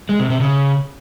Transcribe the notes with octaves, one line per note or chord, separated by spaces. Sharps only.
G#3
C3
C3
C#3